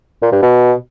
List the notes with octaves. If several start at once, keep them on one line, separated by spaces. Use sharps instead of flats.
A#2
G2
B2